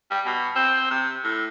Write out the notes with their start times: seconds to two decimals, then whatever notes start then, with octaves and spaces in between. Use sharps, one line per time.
0.11 G3
0.26 B2
0.56 C4
0.91 C3
1.24 A2